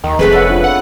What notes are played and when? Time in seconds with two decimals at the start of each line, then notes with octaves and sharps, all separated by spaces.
0.04 D#2 D#3
0.19 F1 G#3 A3 C4 B4 B5
0.32 F1 A4 C#5 E5 F#5
0.50 D4 F4
0.64 B4 F#5